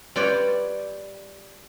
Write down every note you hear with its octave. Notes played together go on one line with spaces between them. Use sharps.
G3 F4 B4 C#5 D5